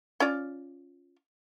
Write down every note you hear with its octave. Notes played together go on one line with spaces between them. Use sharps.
C#4 F4 D5